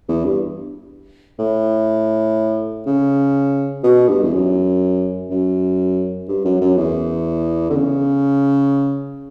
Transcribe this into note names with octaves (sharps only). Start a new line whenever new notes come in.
E2
G2
A2
C#3
B2
G2
E2
F#2
F#2
G2
F#2
F#2
E2
D3
C#3